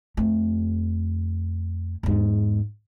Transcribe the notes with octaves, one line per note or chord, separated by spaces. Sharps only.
F2 A3
E2 G#2